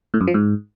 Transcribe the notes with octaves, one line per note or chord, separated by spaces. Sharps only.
A2
F#2
F3
G#2